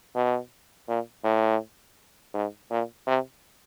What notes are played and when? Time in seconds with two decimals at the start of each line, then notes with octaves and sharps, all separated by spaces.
0.15 B2
0.88 A#2
1.24 A2
2.34 G#2
2.70 A#2
3.07 C3